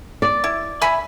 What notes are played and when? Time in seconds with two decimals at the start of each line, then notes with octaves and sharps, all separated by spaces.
0.22 D5
0.44 E4
0.81 E5 G#5 B5